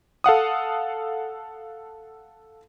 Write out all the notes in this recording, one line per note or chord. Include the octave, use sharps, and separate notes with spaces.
A4 F5 F#5 D#6